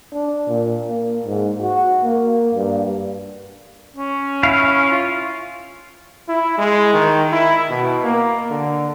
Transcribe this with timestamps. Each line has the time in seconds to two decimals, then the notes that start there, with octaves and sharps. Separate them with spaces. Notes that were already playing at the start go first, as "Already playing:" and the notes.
0.13 D4
0.48 A#2
0.88 A#3
1.25 G#2
1.61 F#4
2.03 A#3
2.54 G2
3.97 C#4
4.43 E4 F5
4.91 F4
6.28 E4
6.58 G#3
6.93 D#3
7.32 E4
7.70 B2
8.04 A#3
8.50 D3